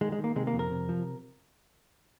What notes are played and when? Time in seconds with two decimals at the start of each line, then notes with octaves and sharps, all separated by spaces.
0.01 D#3 G#3
0.12 G#3
0.18 D#3
0.24 A#3
0.36 C3 G#3
0.47 A#3
0.53 F2
0.59 A#4
0.71 C3
0.89 F3